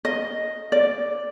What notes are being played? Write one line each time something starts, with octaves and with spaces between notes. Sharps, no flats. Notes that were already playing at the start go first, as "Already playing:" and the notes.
D#5
D5